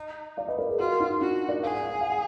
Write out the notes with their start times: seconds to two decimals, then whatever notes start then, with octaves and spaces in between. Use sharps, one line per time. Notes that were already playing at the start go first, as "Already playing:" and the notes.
Already playing: D#4
0.37 D5 F5
0.48 B4 D#5
0.59 A#4 D5
0.68 G#4 B4
0.79 F4 F#4 A#4
1.00 D#4 F#4
1.21 D4 F4 F#4
1.49 A#4 D5
1.62 G#4 F5
1.72 F#5
1.82 F5
1.91 F#5
2.01 F5
2.10 F#5